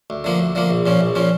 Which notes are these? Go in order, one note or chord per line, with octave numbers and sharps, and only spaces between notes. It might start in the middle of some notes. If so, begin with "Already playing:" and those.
D2
D3 F3 A#3
D2
D3 F3 A#3
A#1
A#2 F3 C#4
A#1
A#2 F3 C#4